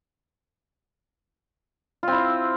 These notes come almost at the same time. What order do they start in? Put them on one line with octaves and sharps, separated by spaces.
F4 C4 E4